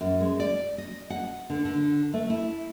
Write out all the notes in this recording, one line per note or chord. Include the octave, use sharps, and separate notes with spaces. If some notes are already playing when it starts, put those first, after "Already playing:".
F#2
G#3
D5
D#5
F#5
D3
D3
A3
E4